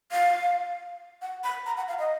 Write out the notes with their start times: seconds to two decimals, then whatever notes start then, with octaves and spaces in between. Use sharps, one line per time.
0.12 F5
1.22 F#5
1.44 B5
1.66 A#5
1.77 F#5
1.88 F5
1.99 D#5